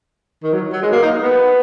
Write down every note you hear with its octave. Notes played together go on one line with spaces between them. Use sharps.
D#3
F#3
F#3
G#3
A#3
D#4
B3